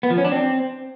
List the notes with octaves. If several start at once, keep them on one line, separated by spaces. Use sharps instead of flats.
B3
F3
C#4
D4
C4